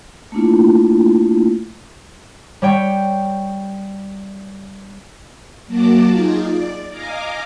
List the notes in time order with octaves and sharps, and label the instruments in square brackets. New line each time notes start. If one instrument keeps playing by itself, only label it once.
[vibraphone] A3 A#3 C#4 D4 E4 F4
[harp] G3 C#5 G5
[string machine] F#3 A#3 F#4 A5 D6
D#4 F4 G#4
D5
D#5 F5 G#5 A#5 D6